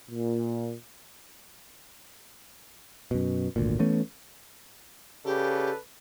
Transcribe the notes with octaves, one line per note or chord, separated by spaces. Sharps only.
A#2
F#2 B2
G#1 D2 A#2
E3 A3 B3 C#4
C#3 G4 A4 B4 D5